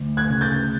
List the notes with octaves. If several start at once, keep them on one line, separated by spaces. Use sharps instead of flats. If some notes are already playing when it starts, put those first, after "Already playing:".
Already playing: D2
F#6 G#6
C#3
G6 A6